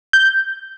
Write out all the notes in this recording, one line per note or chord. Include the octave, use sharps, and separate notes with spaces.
G6